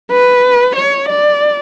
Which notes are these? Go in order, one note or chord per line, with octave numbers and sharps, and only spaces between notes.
B4
C#5
D5